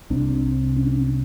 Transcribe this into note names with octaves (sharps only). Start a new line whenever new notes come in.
C2 C3 D4
C#4
D4
C#4